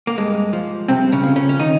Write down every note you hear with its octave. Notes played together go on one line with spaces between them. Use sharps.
A#3
G2 G#3
F3
G2 C3 C4
C#3 C#4
F3
C#3 C#4
C#4
D#3 D#4